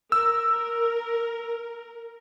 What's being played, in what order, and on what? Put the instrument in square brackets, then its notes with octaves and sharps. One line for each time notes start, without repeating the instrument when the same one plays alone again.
[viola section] A#4 [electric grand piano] E6